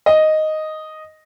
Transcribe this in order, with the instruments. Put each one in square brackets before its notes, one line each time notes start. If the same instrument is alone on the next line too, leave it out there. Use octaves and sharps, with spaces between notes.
[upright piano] D#5